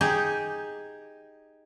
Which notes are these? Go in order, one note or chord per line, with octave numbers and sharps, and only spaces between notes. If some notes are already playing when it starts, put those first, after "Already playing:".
D#4 G4 G#4